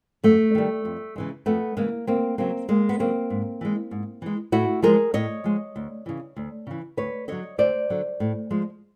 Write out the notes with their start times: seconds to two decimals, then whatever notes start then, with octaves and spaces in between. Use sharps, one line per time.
0.24 F#2 A3
0.55 D#3 G3
0.85 F2
1.16 C#3 E3 G#3
1.46 F2 A3 B3
1.77 C#3 E3 G#3 A#3
2.07 D2 A#3 C4
2.38 C#3 F#3 A#3 C4
2.68 D2 G#3 A#3
2.89 B3
2.99 C#3 F#3 A#3 C4
3.30 G#2
3.61 E3 G#3
3.91 G#2
4.22 E3 G#3
4.52 A2 E4 F#4
4.82 F3 G#3 G#4 A#4
5.14 A2 C#5 D#5
5.44 F3 G#3
5.76 D2
6.06 C#3 E3
6.36 D2
6.67 C#3 E3
6.97 D2 B4 C#5
7.28 D3 F#3 C#5 D#5
7.58 D2 C5 D5
7.90 D3 F#3
8.20 A2
8.50 F3 G#3